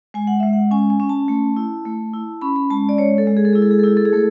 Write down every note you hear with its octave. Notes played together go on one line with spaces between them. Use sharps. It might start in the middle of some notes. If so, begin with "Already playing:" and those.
G#3 G#5
F#5
G#3 E5
F#5
C#4 G#5
G#5
C#4
A5
A3
E4
A3
E4
C#4 B5
B5
G#3 A5
D5
G#3 C#5
A4
G#3
G#4
A4
E4 G#4
A4
G#4
A4
E4 G#4
A4
G#4
A3 A4